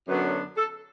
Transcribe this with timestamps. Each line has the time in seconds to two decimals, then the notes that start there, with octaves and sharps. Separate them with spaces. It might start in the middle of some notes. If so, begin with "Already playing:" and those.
0.08 F#2 D3 F#3 B3 D4 B4
0.57 A4